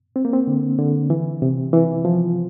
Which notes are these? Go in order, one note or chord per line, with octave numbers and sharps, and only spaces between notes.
C4
A#3
C4
D3
D3
E3
C3
E3
F3